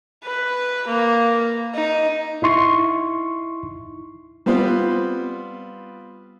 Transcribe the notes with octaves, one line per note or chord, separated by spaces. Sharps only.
B4
A#3
D#4
D#4 E4 C6 C#6
G3 B3 C4 F4 B4 C5